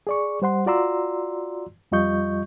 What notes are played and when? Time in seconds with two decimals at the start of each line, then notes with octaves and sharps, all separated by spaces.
0.07 G#4 D5 C#6
0.42 G3 C5 F#5 C6
0.66 F4 F#4 D5 A#5 C6 E6
1.92 F2 G3 F4 D#5 C#6 G6